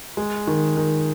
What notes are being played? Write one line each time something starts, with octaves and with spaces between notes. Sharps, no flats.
G#3
D#3
D#3